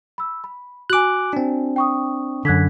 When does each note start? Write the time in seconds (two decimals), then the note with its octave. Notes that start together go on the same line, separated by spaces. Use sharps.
0.18 B5 E6
0.44 B5
0.90 F#4 G#5 D6 F#6
1.33 C4 D4
1.76 G5 C#6 D#6
2.45 F#2 D3 F#6 G#6 B6